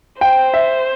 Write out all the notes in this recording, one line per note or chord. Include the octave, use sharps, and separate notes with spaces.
C5 G5
E5